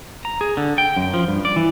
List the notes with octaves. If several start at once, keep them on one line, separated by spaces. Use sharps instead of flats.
A#5
G#4
D3
G5
F#2
F3
G2
D5
E3